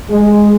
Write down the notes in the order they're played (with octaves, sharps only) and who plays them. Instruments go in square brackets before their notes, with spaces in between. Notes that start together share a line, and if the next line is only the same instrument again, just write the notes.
[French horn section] G#3